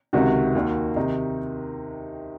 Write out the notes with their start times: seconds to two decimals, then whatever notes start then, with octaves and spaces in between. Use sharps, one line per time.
0.13 C#2 C3 D#3 F#4
0.55 D#2 D#3
0.96 C3 D#3 D#4